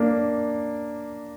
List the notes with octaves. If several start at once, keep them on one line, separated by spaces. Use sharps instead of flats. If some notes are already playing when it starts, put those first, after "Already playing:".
Already playing: A#3 D4